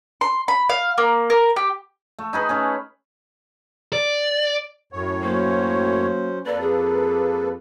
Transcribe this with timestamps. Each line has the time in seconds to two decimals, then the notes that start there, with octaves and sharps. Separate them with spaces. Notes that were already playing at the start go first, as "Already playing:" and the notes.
0.21 C6
0.48 B5
0.70 F5
0.98 A#3
1.30 A#4
1.56 G4
2.19 A3
2.33 D#4 G#4 B4
2.49 A3 C#4 G#4
3.93 D5
4.93 F#2 A2 C#5
5.23 F#3 A#3 C#4 C5
6.46 F2 A#3 A4 B4 D5
6.61 G#4